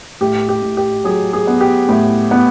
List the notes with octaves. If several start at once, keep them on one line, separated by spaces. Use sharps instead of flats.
A2 G4
G4
A2
G4
F#3 G#4
G#4
B3
G4
A2
B3